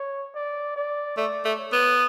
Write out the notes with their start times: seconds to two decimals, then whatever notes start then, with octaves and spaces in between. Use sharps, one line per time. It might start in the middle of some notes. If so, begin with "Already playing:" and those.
Already playing: C#5
0.35 D5
0.76 D5
1.17 A3 D5
1.45 A3
1.59 C#5
1.73 B3